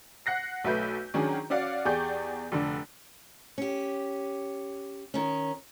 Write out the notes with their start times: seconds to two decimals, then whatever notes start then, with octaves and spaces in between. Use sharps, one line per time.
0.26 F#5 F#6 A#6 C7
0.64 B1 A3 B4 G6
1.14 D#3 F#3 C#4 D4 G#4
1.50 C#4 F#4 D5 F5 F#5
1.85 E2 G4 G#4 D5 C#6 G6
2.52 F1 D3 D4
3.58 C#4 G4
5.14 D#3 C#4